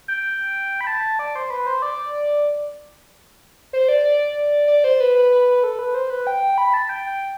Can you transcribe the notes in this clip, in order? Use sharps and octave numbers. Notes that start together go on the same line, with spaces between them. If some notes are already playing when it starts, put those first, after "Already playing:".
G5
B5
A5
D5
C5
B4
C5
D5
C5
D5
D5
D5
C5
B4
B4
B4
B4
A4
B4
C5
B4
G5
B5
A5
G5
G5